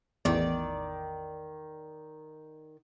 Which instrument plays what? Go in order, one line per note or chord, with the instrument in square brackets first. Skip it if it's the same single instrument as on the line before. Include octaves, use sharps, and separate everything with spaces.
[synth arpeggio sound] A1 E2 [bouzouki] D#3 D5